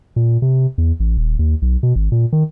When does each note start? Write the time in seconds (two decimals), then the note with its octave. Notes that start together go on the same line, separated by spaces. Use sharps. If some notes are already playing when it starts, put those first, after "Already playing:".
0.16 A#2
0.42 C3
0.78 E2
1.00 A1
1.17 D#1
1.39 D#2
1.62 B1
1.83 B2
1.96 G#1
2.12 A#2
2.32 D#3